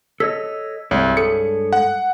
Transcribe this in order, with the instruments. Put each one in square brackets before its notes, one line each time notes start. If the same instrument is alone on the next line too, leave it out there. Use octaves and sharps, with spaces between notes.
[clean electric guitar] A4 C#5 D#5 [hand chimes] B6
[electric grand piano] C2 [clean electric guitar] G2 G#3 C#5
[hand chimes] A4 [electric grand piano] C#7
[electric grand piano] F#5